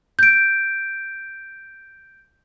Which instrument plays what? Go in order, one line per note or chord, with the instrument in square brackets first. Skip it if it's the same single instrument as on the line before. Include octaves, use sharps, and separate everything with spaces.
[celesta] G6 D7